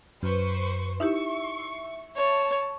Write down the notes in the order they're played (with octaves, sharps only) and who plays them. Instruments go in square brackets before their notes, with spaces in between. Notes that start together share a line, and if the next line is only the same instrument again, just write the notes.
[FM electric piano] F#2 [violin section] B4 C5 C#6
[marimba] D#4 E4 G4 [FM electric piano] E5 [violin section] C#6
[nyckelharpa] C#5 [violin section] A5